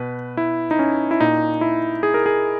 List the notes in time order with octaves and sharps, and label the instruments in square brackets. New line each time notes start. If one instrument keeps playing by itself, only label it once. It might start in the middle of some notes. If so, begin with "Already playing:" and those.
Already playing: [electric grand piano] B2 B4
E4
D#4
C#4
E4
A#2 D#4
E4
G#4
A#4
G#4